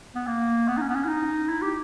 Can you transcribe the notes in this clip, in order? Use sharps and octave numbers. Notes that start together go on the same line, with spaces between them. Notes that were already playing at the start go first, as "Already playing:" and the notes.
B3
A#3
B3
D#4
C#4
B3
C#4
E4
D#4
E4
G4